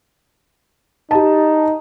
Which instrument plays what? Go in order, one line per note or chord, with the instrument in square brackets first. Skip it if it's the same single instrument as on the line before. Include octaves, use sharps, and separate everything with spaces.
[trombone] D#4 [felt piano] G4 A5